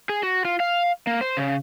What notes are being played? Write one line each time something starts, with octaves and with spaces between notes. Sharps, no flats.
G#4
F#4
F4
F5
A#3
C5
C#3